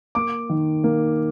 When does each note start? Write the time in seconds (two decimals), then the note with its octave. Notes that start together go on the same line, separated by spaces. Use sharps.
0.15 A#3 D6
0.50 D#3
0.84 A#3